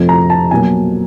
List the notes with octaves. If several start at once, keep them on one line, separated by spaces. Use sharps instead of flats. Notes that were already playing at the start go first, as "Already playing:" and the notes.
Already playing: F2 C3 F3 A3
A#5
A5
B2 F#3 A#3 G#5